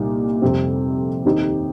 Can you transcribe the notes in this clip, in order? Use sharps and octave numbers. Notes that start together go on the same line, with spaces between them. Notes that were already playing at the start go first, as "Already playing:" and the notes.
Already playing: C2 A#2 G3 D#4
F2 C3 G3 C4
D#2 D#3 C4 D#4 G4